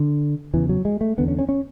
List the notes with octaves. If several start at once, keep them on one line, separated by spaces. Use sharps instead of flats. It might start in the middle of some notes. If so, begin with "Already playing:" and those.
Already playing: D3
E2 C#3 E3
F#3
G#3
A3
E2 D3 B3
C#4
C#4
C#4